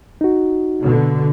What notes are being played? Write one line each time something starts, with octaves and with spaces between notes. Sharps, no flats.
D#4 F#4
B2 D3